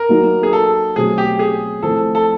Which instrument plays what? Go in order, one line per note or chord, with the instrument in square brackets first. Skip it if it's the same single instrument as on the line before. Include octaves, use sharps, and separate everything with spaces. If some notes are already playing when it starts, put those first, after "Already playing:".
Already playing: [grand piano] A#4
[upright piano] F#3 A#3 D#4 F#4
[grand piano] G#4
A4
[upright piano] B2 F#3 A3 C4 [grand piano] G#4
[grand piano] G4
G#4
[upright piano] F3 A3 C4 E4 [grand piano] A4
[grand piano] A4